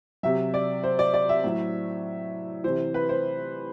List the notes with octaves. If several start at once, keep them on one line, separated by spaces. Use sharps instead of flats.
C3 F#3 E5
D5
C5
D5
D5
E5
A2 F#3
C3 E3 C5
B4
C5